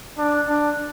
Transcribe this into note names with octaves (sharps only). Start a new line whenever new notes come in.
D4
D4